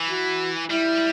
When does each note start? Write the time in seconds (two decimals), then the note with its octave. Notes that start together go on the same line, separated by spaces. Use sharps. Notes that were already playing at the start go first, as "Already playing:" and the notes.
Already playing: E3
0.09 F#4
0.70 G3 E4